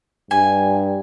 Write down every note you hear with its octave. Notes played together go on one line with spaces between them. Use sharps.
G2 G#5